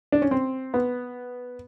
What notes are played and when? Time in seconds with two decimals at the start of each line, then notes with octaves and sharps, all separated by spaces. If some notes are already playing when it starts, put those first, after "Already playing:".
0.12 D4
0.22 C#4
0.31 C4
0.74 B3